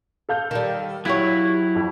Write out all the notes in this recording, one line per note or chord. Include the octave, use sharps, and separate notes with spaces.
A4 F5 G6
D#3 G3
F#3 E4 F4 G4 C#5
F2